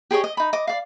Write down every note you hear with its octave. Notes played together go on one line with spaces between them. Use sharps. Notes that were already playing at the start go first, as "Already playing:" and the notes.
G4 G#4 C#5 D#5
D#5
D#4 B5
D#5 D6
D5 F5